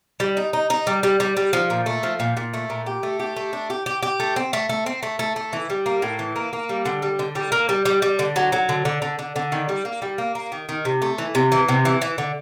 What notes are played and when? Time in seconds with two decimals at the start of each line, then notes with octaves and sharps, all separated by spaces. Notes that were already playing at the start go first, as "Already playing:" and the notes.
0.20 G3
0.37 D#4
0.53 D#4
0.70 D#4
0.87 G3
1.03 G3
1.20 G3
1.37 G3
1.53 F3
1.70 A#2
1.86 A3
2.03 F3
2.20 A#2
2.37 A#2
2.54 A3
2.70 A#2
2.86 G4
3.03 A3
3.20 G4
3.36 A3
3.53 D4
3.70 G4
3.86 G4
4.03 G4
4.20 A3
4.36 C4
4.53 A3
4.69 A3
4.86 C4
5.03 A3
5.19 A3
5.36 A3
5.53 E3
5.70 G3
5.86 A#3
6.02 A2
6.19 E3
6.36 A#3
6.53 A#3
6.69 G3
6.86 D3
7.02 G3
7.19 D3
7.35 G3
7.52 A#3
7.69 G3
7.85 G3
8.02 G3
8.19 D3
8.36 F#3
8.52 F#3
8.69 D3
8.85 D3
9.02 D3
9.19 D3
9.36 D3
9.52 D#3
9.69 G3
9.85 A#3
10.02 G3
10.18 A#3
10.35 A#3
10.52 D#3
10.69 D#3
10.85 C3
11.02 A3
11.18 E3
11.35 C3
11.52 E3
11.69 C3
11.85 E3
12.02 E3
12.18 D3